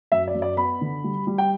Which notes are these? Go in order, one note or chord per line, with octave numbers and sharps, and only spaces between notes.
F#2 E5
D5
F#2
D5
B3 B5
D3
G3
G3
G5